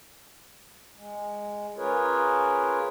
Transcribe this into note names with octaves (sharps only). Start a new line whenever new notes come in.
G#3
C#4 F4 G#4 A#4 B4 C#5